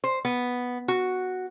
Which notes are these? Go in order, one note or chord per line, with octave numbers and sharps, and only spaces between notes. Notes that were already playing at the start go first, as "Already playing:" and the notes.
C5
B3
F#4